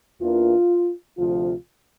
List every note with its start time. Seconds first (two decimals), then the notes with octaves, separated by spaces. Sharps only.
0.20 E2 E3 A#3 D4 F4
1.18 D2 C3 F3 F4